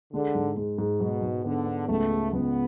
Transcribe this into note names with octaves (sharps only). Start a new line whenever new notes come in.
D3 G#3
G#2
G#3
G#2
G#2 B2
G#2
D3 B3
B3
C#2 A3
G#3
C#2 B3